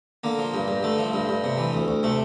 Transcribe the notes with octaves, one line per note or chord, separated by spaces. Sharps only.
D3 A#3
F3
G2
G2
D3 A3
F3
G2
G2
C3
E3
D2
D2
C3 A3